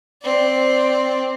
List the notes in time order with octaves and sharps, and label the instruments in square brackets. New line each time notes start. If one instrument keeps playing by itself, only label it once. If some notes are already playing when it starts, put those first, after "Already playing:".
[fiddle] C4 D5